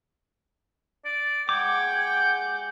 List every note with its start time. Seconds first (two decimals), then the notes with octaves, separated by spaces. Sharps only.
1.05 D5 D7
1.49 G#3 F#5 G5 D6 G#6
2.19 G6